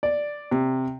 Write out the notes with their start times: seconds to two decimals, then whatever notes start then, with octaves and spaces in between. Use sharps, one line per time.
0.03 D5
0.51 C3